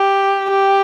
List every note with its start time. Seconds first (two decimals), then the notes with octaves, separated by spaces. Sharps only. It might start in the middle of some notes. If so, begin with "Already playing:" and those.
Already playing: G4
0.50 G4